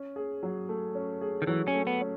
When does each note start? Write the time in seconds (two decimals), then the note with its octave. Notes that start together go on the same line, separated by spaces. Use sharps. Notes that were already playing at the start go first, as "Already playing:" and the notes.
Already playing: C#4
0.16 G#4
0.43 F#3
0.69 A3
0.95 C#4
1.21 G#4
1.42 D#3
1.47 E3 F#3
1.68 C#4
1.74 A3
1.87 B3
2.01 C#4